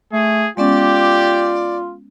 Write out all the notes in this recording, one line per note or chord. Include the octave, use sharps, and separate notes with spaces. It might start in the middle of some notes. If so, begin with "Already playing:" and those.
A3 G#4
G#3 B3 C#4 F4 G4 D5